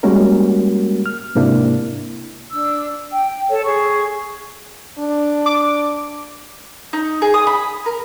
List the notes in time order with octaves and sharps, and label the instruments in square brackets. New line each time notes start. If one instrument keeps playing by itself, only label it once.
[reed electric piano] G3 G#3 A#3 C#4 F#4 A#4
F6
G#2 C3 A#3 D4 E4
[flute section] D4 E6
G5
A4 C#5
G#4 C#6
[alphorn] D4
[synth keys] D6
[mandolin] D#4
G#4
D#6
B5
A#4